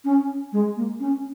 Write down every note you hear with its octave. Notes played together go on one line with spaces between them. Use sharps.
C#4
G#3
A#3
C#4